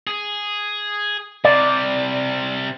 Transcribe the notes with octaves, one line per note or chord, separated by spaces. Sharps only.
G#4
C3 G3 D5